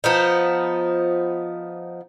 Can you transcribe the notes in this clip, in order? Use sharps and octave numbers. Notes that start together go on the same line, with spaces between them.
F3 B3 D#4